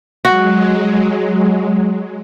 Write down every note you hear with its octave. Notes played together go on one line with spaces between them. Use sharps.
F#3 G#3 F#4